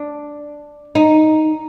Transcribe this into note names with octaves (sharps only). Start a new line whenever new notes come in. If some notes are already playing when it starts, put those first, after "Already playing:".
Already playing: D4
D#4